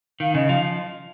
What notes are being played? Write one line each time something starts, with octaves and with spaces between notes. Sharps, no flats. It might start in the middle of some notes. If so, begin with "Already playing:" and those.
D#3 F5
C#3 D#5
F3 F5